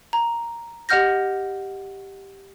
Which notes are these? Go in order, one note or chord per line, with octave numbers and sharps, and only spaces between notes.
A#5
G4 D#5 F#5 F6 G6 A#6